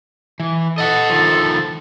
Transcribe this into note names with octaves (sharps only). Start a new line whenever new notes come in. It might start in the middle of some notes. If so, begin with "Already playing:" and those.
E3
A4 D#5 F#5
D#3 F3